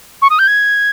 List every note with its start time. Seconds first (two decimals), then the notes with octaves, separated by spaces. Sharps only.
0.22 C#6
0.30 D#6
0.39 G6
0.47 G#6